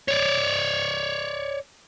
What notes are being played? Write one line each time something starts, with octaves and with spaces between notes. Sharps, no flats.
C#5 D5